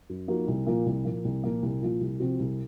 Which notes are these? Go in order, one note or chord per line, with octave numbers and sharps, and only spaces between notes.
F#2
F3 A#3 D#4 F#4
C2
A#2 F3 A#3
C2
A#2 F3 A#3
C2
A#2 F3 A#3
C2
A#2 F3 A#3
C2
C3 F3 C4 F#4
C2